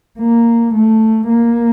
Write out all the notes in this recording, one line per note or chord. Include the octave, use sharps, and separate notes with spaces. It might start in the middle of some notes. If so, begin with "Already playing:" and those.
A#3
A3
A#3